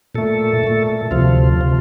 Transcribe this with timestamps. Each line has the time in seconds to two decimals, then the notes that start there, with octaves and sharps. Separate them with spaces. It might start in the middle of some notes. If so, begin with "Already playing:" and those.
0.14 A#2 A3 A4
0.64 A#2 A3
1.11 D2 C3 F3 F4
1.61 C3 F3